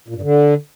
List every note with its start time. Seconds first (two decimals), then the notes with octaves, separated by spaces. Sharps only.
0.08 A#2
0.15 G2
0.22 D3